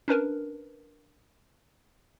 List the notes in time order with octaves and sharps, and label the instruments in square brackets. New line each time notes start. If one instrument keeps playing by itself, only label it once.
[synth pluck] C#4 D4 A#4 B4